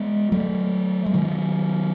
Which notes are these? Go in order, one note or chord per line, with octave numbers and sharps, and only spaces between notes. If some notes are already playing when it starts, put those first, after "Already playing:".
Already playing: G#3 B3
F#3 A3
G#3
D#3 F#3